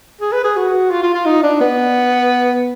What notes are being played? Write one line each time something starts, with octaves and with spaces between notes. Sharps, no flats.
G#4
B4
G#4
F#4
F4
F4
F4
D#4
D4
B3